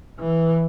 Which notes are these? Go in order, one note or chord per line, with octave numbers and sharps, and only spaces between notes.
E3